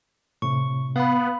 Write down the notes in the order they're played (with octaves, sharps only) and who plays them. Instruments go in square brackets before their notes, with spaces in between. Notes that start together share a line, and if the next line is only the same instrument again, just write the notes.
[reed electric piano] A2 C3 [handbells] C#6
[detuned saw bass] B3 [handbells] F5 B5